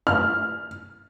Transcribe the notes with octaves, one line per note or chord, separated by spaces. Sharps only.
F6